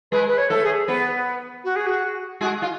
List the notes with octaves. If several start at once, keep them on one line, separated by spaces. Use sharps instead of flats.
G#3 G#4 B4
B4
C#5
A3 A4
G#4
B3 B4
F#4
G#4
F#4
G#3 F#4 G#4
F4